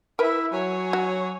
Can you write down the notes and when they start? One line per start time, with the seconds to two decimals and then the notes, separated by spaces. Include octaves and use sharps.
0.19 E4 A#4 B4 E5
0.52 F#3 C#5 G#5
0.93 F#4